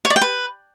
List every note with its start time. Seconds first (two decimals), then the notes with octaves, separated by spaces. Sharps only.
0.05 C#5
0.10 D5
0.16 G5
0.21 B4